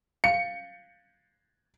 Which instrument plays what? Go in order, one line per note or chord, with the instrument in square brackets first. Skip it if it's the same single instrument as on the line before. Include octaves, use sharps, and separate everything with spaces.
[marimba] F5 [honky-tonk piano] C#7